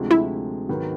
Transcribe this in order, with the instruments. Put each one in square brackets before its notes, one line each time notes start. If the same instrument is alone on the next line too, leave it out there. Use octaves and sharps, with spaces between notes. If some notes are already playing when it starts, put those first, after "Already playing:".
Already playing: [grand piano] D2 C3 F3 G#3
[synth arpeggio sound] E4
[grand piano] G#2 D#3 F#3 B3